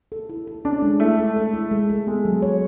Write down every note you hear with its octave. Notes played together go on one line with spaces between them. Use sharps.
A4
E4
A4
C#4 D4
G#3
A3 E4
A4
A4
E4
G#3
A4
G#3 B3
F#3
C#5